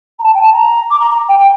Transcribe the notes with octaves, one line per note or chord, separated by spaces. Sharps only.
A#5
A5
G5
A5
A#5
D6
A#5
A#5
G5
G5